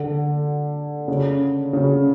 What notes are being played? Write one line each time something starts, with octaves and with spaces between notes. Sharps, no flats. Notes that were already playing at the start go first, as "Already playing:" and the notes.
Already playing: D3
C#3
C#3